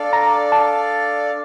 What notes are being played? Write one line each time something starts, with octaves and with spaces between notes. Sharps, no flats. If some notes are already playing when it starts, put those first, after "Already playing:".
Already playing: D4 A4 D5 F5
A#5
A5